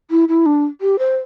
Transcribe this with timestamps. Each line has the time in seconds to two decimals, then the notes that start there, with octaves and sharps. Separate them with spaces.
0.11 E4
0.29 E4
0.46 D4
0.81 G4
0.99 C5